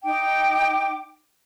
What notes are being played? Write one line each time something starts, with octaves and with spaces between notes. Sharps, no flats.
D#4 G5 D6